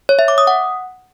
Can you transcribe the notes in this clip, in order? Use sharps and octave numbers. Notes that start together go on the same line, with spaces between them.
C#5
E5
D6
D#6
F#5